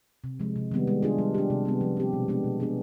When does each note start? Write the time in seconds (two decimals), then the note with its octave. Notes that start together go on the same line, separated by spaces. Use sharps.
0.24 C3
0.40 F3 G#3
0.56 C3
0.71 D#3 G3 B3
0.87 G#3
1.03 D4 F4 G#4
1.18 G3
1.35 D4 G4
1.50 C3
1.65 G3 B3
1.81 F3
1.97 C4 G4
2.13 B2
2.28 G#3 B3 D4
2.44 B2
2.60 B3 D4 G#4